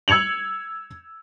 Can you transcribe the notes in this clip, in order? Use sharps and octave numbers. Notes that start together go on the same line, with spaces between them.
E6 G#6 C#7 F7 F#7